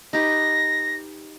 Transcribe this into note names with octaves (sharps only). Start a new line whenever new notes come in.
D#4 G4 B4 A#6